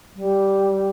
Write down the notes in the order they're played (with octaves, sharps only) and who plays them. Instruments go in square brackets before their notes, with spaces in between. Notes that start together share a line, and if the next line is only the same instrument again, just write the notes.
[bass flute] G3